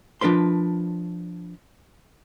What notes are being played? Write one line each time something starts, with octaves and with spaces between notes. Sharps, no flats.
F3 D4 A#4 B4 C6